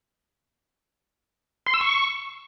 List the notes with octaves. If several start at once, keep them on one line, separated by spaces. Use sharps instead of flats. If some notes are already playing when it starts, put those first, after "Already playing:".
C6
E6
C#6